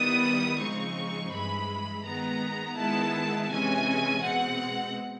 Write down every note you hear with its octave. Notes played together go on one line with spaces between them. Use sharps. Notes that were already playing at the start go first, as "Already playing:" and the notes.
Already playing: D#3 G3 B3 E4 D#6
C#3 F3 G#3 C4 D#4 C#6
G2 E3 G#3 B5
D#3 G#3 B3 A#5
D#3 G#3 B3 E4 A5
C3 E3 G#3 C#4 G#5
B2 G#3 C4 F#5